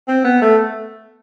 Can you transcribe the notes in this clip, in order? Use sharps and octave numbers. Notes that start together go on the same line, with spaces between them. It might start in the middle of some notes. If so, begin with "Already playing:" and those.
C4
B3
A3